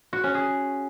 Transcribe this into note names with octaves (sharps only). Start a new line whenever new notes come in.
F#4
C#4
G#4